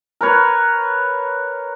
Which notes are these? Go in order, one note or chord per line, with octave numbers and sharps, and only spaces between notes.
A#4 B4 C#5